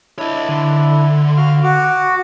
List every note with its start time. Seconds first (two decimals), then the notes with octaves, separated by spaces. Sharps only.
0.19 D4 E4 C#5 D#5
0.48 D3
1.37 F#4 F5 F6
1.64 F#4 C#6 D6